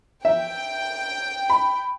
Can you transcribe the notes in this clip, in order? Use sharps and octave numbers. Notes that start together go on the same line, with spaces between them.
E5 G5
B5